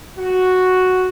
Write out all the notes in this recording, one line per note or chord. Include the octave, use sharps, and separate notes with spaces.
F#4